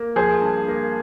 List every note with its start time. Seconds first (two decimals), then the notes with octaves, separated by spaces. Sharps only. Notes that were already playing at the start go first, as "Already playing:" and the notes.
Already playing: A#3
0.16 F3 G#4 C5
0.42 G2
0.68 A#3